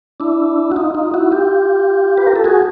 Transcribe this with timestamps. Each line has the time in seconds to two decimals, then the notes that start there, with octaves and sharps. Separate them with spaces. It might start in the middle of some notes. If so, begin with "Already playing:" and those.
0.20 D4 E4
0.72 F#4
0.76 D#4 F4
0.95 D#4 F4
1.14 E4 F#4
1.32 F4 G4
2.18 B4
2.27 A#4
2.36 A4
2.44 F#4 G#4